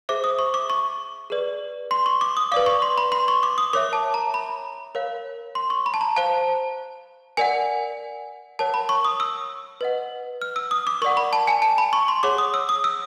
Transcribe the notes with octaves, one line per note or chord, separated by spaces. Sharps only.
G#4 C5 E5 D6
D#6
C#6
D6
C#6
G#4 B4 D5
C6
C#6
D6
D#6
B4 D5 F5 D6
C#6
C6
B5
C6
C#6
D6
D#6
A#4 C#5 E5 D6
A5
A#5
B5
A#4 C#5 F5
C6
C#6
B5
A5
A#5
C5 F5 A5
A#4 D5 F#5 G#5
A#4 C#5 F#5 A5
B5
C#6
D#6
E6
B4 D#5 F#5
F6
E6
D#6
D6
A#4 D5 F#5 C#6
B5
A5
G#5
A5
B5
C#6
C6
G#4 C#5 F#5 D6
D#6
E6
D#6
E6